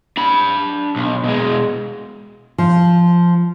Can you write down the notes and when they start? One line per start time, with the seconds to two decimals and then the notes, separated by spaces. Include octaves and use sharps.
0.17 D4 B5
0.96 B1
1.24 B2 G#3
2.58 F3